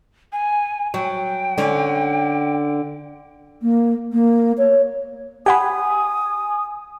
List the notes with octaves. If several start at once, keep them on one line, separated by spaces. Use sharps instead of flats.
G#5
F#3 G5
D3 C#4
A#3
A#3
C#5
G4 F#5 G#5 B5 D#6